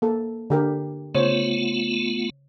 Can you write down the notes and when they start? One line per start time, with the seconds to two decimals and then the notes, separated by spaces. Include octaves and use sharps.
0.02 A#3 A4
0.50 D3 G4 A#4
1.15 C#3 A3 B3 F4 C5 C#5